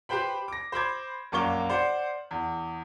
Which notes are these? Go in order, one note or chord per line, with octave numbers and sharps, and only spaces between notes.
G4 B4 C5 G5 B5
D6 A#6
C5 B5 D6 G#6
A#1 F#2 A#3 C#6 D6 G7
C5 D5 F#5
E2